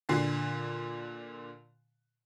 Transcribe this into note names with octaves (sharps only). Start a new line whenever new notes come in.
A#2 D3 C7